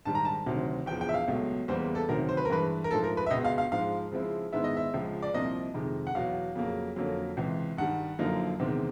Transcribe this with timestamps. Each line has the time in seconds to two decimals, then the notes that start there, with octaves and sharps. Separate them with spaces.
0.05 G#2 D#3 G3 A5
0.15 A#5
0.25 A5
0.46 D2 C3 D#3 F#3
0.86 E2 C#3 F3 G5
1.01 G5
1.09 E5
1.14 F5
1.28 C#2 B2 F#3 A3
1.68 E2 C#3 E3 G3 A#3 C5
1.95 A4
2.09 D2 C3 D#3 F#3 A#4
2.29 C5
2.37 B4
2.45 A#4
2.49 G2 E3 G#3 B4
2.84 A#4
2.90 G#2 F3 A3 A4
3.04 A#4
3.17 B4
3.26 E5
3.31 C#2 B2 G#3 B3 D#5
3.44 F5
3.58 F5
3.72 G#2 F3 G#3 F5
4.12 C#3 F3 G#3 C4 E4
4.52 G#2 D#3 G#3 B3 E4 E5
4.64 D#5
4.77 E5
4.94 C#2 C#3 F3
5.22 D5
5.33 C2 C3 F3 A#3 D#5
5.74 F2 C3 D#3 G#3
6.07 F#5
6.15 E2 B2 F#3 B3 F5
6.56 F2 C#3 F#3 A#3
6.96 F2 D3 F#3 A#3 C#4
7.37 C#2 C3 E3
7.77 G2 D#3 G3 F#5
8.19 F#2 D3 F3 A#3 D#4
8.60 E2 C3 D#3 G#3 C4